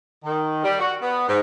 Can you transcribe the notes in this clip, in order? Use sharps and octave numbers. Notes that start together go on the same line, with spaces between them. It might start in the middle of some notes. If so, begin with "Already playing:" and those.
D#3
G3
F#4
B3
G#2